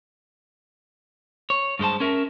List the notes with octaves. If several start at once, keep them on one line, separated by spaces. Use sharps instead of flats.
C#5
G2 G#3 C5 A5
C#4 A#4 E5